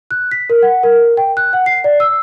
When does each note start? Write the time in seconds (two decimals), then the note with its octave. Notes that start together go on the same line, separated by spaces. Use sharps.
0.11 F#6
0.31 B6
0.50 A#4
0.62 F#5
0.83 A#4
1.17 G5
1.37 F#6
1.53 F#5
1.66 C7
1.84 D5
2.00 E6